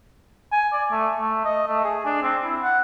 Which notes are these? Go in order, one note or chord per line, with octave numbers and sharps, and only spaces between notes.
G#5
D5
A3
A3
D#5
A3
G#4
D4
C4
E4
F#5